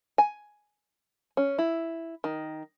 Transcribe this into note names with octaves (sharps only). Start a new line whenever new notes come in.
G#5
C#4
E4
D#3